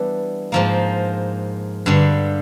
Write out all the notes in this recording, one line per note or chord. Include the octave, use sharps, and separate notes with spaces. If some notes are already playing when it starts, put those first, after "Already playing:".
Already playing: E3 G3 B3 D4
G#2 F3 A#3
G2 D3 G3